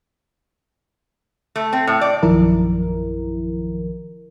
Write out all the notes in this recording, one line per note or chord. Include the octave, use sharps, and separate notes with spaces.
A3
C4
A2
D5
A#1 F#2 D#3 F3 E4 A#4